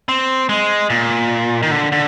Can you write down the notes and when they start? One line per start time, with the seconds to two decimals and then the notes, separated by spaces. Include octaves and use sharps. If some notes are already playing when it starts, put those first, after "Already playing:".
0.09 C4
0.49 G#3
0.90 A#2
1.63 D#3
1.71 D3
1.92 D3